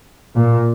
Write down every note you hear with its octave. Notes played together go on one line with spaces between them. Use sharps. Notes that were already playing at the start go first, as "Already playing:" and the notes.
A#2